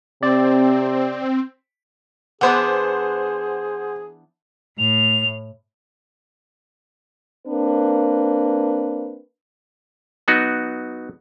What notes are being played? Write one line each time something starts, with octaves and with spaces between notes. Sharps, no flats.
C3 C4 D5
E3 B3 D4 G#4 C5 F#5
A2 F7
A#3 C4 D4 B4
F#3 B3 D#4 F#4